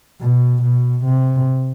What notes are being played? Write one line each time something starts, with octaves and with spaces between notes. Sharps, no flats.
B2
B2
C3